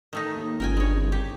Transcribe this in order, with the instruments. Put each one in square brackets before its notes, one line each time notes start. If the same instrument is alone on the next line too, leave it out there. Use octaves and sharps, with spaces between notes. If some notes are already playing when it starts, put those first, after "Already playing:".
[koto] D#3 A3 D#4
[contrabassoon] D#2
[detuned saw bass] G1 [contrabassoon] C#2 [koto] A#4 G5 G#5
[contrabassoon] G2 [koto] G#3 C#5
[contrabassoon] C2
[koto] G4